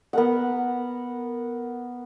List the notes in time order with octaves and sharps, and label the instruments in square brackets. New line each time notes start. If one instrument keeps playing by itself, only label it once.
[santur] B3 A#4 F#5